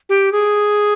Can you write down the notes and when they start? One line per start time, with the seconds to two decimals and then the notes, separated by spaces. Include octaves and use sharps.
0.09 G4
0.32 G#4